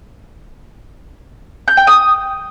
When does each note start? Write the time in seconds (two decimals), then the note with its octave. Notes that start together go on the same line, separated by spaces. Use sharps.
1.68 G6
1.77 G5
1.87 D#6